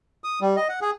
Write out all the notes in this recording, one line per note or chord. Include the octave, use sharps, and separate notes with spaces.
D#6
G3
D#5
F#5
G#4